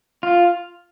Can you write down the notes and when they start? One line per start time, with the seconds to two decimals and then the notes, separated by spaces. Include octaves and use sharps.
0.23 F4